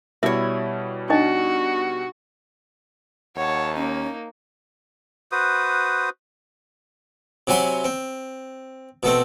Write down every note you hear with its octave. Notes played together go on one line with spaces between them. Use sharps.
B2 G3 E4 C#5 E5
D4 D#4 F#4 D#5
D#2 C#5 F#5 A5
A#3 C#4 D#4
F#4 B4 C5 D#6
C3 F#3 G#5 B5 C6
C4
B2 A3 C4